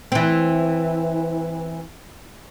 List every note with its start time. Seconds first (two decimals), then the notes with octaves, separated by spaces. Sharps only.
0.12 E3 C4